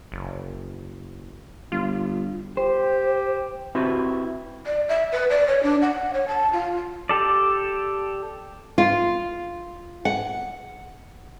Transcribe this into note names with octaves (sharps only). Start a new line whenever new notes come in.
F#1
G1 F4
G4 C5
C4 E4 F#4 G4 B4
D5
E5
B4
D5
C#5
D4
F#5
C#5
A5
F4
G4 A4 D5
F4
F#5